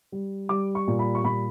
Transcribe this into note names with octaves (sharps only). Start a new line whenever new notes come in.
G3
G3 D6
C#6
A#2
B5
C#6
A#2 B5